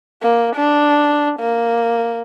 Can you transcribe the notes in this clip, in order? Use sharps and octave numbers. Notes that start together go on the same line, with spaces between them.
A#3
D4
A#3